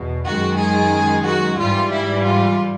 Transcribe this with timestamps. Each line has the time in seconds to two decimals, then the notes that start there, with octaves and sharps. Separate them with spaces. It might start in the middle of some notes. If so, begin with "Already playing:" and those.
Already playing: E2 B2
0.26 F#2 D#3 G#3 F#4
0.60 G#4
1.26 F#4
1.59 G#2 E3 G3 F4
1.93 E4
2.25 F4